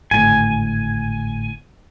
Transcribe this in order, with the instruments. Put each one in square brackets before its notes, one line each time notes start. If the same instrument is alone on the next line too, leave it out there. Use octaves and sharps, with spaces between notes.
[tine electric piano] G#1 A2 D3 [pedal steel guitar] G#5